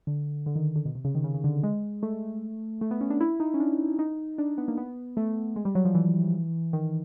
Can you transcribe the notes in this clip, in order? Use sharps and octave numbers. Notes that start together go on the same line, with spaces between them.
D3
D3
D#3
D3
B2
C3
C#3
D#3
C#3
C#3
D3
G#3
A3
A3
B3
C#4
D4
E4
D#4
C#4
D4
D#4
D4
B3
A#3
B3
A3
G#3
G3
F#3
F3
E3
D#3